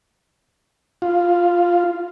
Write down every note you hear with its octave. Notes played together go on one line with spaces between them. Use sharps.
F4